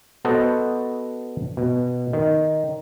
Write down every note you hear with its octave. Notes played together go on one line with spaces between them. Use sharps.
B3 F#4 A4 C5 D#5 F#5
B2
D#3